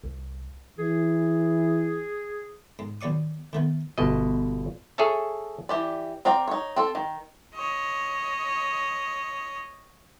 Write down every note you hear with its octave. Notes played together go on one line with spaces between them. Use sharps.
C2
E3 G#4
G#2
D#2 F#3 D5 C#6 D#6
D#3 A3 B3
G1 B2 D#5
G#4 A4 C#5 E5 A5
E3 G4 D5
C4 A#4 D5 G5
D#4 C#5
C4 A4
D#3
C#5 D#5